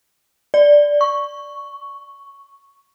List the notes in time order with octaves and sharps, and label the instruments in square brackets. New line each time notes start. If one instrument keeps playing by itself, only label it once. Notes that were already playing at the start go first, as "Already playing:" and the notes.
[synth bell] D5
C#6